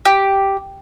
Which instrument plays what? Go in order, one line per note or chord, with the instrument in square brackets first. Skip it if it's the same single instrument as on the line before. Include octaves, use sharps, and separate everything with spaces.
[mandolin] G4